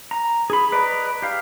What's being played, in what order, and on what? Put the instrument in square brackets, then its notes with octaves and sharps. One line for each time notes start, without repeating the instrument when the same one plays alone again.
[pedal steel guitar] A#5
G#4 B5
B4 D5 D#5 A#5
G4 F5